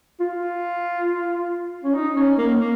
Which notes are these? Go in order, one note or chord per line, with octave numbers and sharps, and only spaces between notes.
F4
C#4
D#4
C#4
A#3
A#3